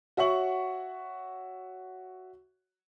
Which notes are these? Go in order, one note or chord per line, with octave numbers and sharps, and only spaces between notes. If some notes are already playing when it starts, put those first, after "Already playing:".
F#4 C#5 E5 F#5 C#6 F#7